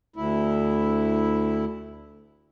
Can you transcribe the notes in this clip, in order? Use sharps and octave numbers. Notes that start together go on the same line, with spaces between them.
D2 E4